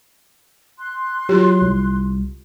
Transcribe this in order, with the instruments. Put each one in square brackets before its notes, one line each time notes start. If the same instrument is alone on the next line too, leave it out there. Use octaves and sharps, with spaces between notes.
[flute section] C6 F#6
[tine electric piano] F#3 [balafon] F4 G4
[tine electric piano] C2